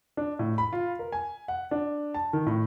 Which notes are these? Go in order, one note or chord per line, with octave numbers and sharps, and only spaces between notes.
D4
A2
B5
F4
A#4
G#5
F#5
D4
A5
D#3
A2